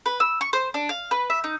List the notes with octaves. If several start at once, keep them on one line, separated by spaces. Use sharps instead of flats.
B4
E6
C#6
C5
D4
F5
B4
E5
D#4